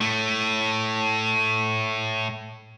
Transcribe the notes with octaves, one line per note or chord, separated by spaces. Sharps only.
A2 A3